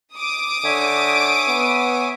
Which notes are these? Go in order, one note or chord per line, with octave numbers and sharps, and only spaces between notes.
D6 D#6
D3 C#5 E5 G#5
B3